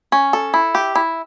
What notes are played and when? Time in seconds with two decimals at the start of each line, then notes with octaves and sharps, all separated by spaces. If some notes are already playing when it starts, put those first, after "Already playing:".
0.12 C#4
0.33 A4
0.54 E4
0.75 G4
0.95 E4